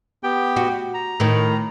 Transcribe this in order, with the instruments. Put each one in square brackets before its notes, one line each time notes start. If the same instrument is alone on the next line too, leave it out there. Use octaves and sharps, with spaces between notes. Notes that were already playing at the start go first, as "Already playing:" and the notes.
[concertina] B3 G4 G5
[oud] F#4
[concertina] A#5
[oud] A2 D#3